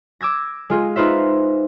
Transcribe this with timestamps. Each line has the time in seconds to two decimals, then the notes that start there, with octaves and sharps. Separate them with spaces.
0.21 D6 E6 G#6 A#6
0.70 G#3 F4 G#4
0.96 D#4 F4 B4 C5 E5